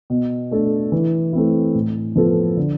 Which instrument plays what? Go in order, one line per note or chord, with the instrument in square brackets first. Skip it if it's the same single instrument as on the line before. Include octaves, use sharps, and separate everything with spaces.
[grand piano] B2
A3 D4 A4
E3
A3 C4 E4
A2
F3 B3 F4 A4
D3